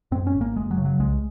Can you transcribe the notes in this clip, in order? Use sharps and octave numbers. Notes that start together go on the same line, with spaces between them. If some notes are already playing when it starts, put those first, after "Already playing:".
F#2 C4
C#4
G#1
A#3
F#1 G#3
F#3
C#3
F#3
C2 G#3